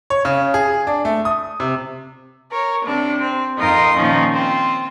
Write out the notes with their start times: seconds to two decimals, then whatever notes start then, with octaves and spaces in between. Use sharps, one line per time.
0.10 C#5
0.25 C#3
0.54 G#4
0.87 D4
1.05 A3
1.25 D#6
1.60 C3
2.52 A#4 C#5
2.84 C3 D4
3.21 C4
3.57 F2 D#4 F4 A#4 C6 D#6
3.95 A#2 D#3 F3 C#4 D#4
4.34 C4 F4